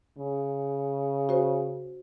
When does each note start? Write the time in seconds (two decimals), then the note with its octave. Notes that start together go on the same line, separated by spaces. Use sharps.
0.18 C#3
1.29 F#4 C5